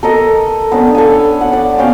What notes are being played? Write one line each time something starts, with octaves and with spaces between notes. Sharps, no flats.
A4 A#4 D#5
B3 C#4 D4
A4 F5 G#5
F#5
D5
B3 C#4 F5 G5